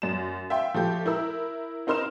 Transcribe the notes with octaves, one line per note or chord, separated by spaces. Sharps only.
F#2 E7
E5 F5 G5 C6
F3 A3 G4 G6
E4 A#4 E6
C4 D#4 A#4 C6 F6 E7